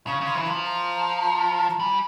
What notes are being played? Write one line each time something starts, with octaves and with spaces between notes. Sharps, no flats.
C#3 C#6
C#3 C6
E3
F3 A#5
A#5
A#5
G3 G#5